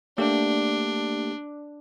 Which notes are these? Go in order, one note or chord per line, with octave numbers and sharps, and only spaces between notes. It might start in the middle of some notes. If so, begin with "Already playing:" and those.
A3 A#3 D4 G4